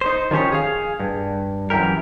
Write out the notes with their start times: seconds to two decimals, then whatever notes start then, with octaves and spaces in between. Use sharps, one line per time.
0.01 D#4 C5
0.31 D#3 F3 C#4 G4 C#5
0.52 G#4 F5
1.00 G2
1.70 F#2 E3 G4 A#4